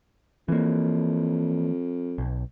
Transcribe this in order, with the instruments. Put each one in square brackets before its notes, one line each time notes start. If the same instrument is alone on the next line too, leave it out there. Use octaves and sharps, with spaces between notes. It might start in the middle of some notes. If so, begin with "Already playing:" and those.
[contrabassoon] F2 [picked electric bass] E3 A#3
[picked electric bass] B1